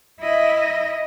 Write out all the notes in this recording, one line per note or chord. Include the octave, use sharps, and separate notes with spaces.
E4 D#5